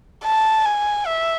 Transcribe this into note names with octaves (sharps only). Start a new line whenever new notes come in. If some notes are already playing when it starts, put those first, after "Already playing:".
A5
G#5
E5